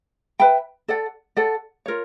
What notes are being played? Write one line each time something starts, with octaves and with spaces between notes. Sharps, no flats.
B4 E5 G5 B5
A4 D5 F#5
A4 D5 F#5
F4 A#4 C#5